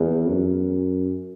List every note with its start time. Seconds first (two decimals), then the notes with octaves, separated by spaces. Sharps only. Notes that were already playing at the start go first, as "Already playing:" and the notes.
Already playing: E2
0.28 F#2